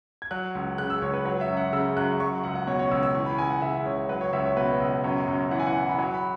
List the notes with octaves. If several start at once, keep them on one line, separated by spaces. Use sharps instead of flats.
G#6
F#3 F#6
C#2
C#3 F#6
E6
C#2 C#5
B4
F#3 C#5
E5
F#2
F#5
C#3 E6
F#2 F#6
F#3 C#6
C#2 F#5
F#5
B2 C#5
C#5
C#2 E6
E6
E3 C#6
B5
C#2 G#5
F#5
C#3 E5
C#2 C#5
F#3 B4
C#5
C#2 E5
C#5
B2 B4
C#2
F#2 C#5
F#2
E3 F#5
G#5
F#5
E3
B5
F#3 G#5
B5